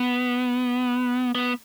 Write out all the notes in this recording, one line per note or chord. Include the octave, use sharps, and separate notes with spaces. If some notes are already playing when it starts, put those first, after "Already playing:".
Already playing: B3
B3